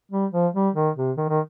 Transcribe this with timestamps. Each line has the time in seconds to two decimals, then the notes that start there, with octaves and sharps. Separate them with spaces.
0.11 G3
0.32 F3
0.54 G3
0.75 D#3
0.97 C3
1.17 D#3
1.29 D#3